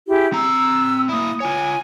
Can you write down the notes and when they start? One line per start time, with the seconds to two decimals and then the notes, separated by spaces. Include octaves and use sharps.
0.08 E4 G4 G#4
0.33 C4 A#5 E6
1.09 A#3 E4 D#6
1.40 F4 C#5 G#5